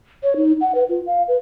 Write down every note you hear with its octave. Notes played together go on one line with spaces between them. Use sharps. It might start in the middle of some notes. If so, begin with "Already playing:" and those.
C#5
D#4
F#5
B4
F4
F5
B4